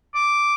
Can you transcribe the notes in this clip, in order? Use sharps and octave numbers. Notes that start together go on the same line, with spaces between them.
D6